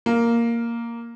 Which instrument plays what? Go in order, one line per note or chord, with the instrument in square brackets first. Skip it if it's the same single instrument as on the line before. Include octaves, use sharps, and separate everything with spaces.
[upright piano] A#3